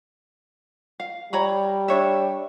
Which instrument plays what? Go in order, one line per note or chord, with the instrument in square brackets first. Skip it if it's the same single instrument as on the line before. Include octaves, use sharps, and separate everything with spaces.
[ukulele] F5
[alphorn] G3 [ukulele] C#5 A#5 B5
[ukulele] D4 C#5 E5